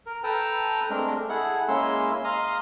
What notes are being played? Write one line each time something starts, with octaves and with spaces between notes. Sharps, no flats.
A#4
A4 B4 G5 A5 A#5
G#3 A3 C4 D4 A#4
E4 G#4 A4 F#5
G#3 A#3 C#4 E4 C6 E6
D#5 F5 A#5 C6 D#6